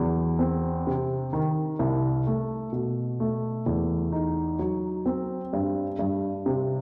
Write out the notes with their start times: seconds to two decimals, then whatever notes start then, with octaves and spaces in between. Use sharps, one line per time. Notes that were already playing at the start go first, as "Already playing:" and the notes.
Already playing: E2 F#3
0.39 C4
0.87 C3
1.33 D#3
1.79 C2
2.27 A3
2.73 B2
3.20 A3
3.66 E2
4.12 D#4
4.59 F#3
5.06 C4
5.53 G2
5.99 G2
6.46 C3